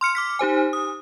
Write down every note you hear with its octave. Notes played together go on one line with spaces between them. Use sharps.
C6 F6 C#7
D6 F6 B6
D#4 G4 C5 G#5
D#6